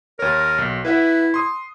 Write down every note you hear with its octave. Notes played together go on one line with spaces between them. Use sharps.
D#2 A#4 C#5
B1
E4 B4 E5 F#5
C6 D#6